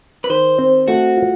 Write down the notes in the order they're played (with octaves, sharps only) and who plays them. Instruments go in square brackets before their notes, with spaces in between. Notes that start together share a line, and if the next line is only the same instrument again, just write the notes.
[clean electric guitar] B4
[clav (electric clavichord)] D#3 [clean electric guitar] C5
[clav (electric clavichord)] C4
[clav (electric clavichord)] A3 [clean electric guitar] F#4
[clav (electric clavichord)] F4